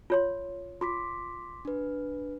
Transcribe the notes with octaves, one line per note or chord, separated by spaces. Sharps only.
F4 C#5 C6
F4 C6 D6 B6
D4 B4